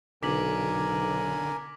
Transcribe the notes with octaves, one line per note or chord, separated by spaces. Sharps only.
B1 D3 A#4 G#5 D6 B6 F#7